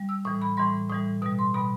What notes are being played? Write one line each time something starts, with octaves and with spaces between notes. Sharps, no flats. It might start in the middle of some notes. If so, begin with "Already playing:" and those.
Already playing: G3
E6
A2 E3 G3 D#6
B5
A2 E3 G3 C6
A2 E3 G3 D#6
B2 G3 D#6
C6
B2 G3 B5